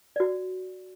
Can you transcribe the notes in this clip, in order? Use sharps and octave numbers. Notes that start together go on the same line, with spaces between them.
F#4 D5